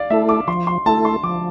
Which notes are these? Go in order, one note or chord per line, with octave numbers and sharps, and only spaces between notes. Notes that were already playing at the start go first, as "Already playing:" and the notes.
Already playing: D5 F5
A3 E4 A4 E5
D6
F3 C6
C6
A3 E4 A4 A5
C6
F3 D6